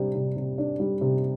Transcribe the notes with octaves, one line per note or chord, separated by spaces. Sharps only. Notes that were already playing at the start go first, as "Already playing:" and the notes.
Already playing: C3 G3 D4
C3
C3
D4
G3
C3